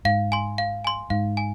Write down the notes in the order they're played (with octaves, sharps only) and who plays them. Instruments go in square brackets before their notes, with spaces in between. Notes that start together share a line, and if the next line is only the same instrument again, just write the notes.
[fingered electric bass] G#2 [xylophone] F5
[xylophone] G#5 C6
F5
G#5 C6
[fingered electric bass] G#2 [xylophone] F5
[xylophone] G#5